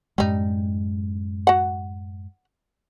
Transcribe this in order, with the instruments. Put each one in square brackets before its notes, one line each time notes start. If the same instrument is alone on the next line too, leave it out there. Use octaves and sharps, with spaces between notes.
[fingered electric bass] F#2 A2 G#3 [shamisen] G3 D#4
[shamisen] F#4 F#5